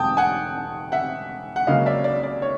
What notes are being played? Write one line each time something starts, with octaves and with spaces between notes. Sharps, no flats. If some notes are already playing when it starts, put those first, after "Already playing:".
Already playing: E1 G5 A5 D#6
F#5 G#5
E5 F#5
F#5
C#2 C#3 F#3 A#3 D#5 F5
D5 E5
D5
D5
C#5